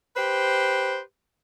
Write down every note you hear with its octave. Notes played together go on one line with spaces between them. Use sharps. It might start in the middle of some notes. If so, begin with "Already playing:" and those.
G4 B4 C5